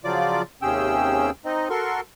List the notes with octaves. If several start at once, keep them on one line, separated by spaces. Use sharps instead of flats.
C#3 F3 F#3 F4 D5 D6
D#2 C3 C#4 G#4 G5 E6
C4 D#4 D#5
F#4 A4 A#4 C6 C#6